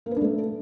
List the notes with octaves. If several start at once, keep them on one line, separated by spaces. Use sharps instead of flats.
A#3
B4
D4
A3